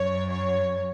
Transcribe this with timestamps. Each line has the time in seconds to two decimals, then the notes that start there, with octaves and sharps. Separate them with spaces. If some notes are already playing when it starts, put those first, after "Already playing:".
Already playing: F#2 C#5
0.31 C#5